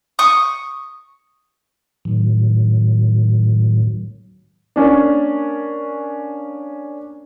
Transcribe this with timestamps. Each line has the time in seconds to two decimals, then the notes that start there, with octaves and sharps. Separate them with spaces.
0.19 C#6 D#6
2.05 A2 D#3 F#3
4.76 A#3 C#4 D4